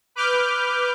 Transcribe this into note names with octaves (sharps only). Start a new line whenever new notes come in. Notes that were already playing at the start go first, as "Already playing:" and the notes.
B4 D6 F6 G6